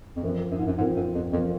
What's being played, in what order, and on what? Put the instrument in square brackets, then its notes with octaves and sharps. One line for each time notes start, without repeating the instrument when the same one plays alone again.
[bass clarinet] F2
[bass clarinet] F#2 [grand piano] F3 C4 F4 A#4
[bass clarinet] F#2
G#2
F#2
[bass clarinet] G#2 [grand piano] F3 C4 F4 A#4
[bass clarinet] F#2
F2
[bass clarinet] F2 [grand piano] F3 C4 F4 A#4